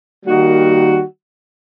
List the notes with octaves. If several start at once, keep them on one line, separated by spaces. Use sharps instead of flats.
D#3 G3 A#3 D#4 F#4